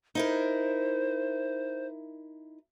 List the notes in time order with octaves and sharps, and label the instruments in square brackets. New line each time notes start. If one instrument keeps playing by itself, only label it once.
[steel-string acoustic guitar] D#4 E4 A#4 [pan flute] C5